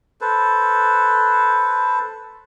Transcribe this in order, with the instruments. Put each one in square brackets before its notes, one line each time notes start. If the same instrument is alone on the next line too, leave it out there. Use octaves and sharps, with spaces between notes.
[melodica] A4 B4 C5